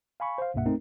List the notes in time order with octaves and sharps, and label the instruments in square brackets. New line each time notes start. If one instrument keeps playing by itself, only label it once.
[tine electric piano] F5 G#5 B5 C#6
C5 F5
C2 G2 B2 A#3 E5 F#5
A3 C4 D#4 A#4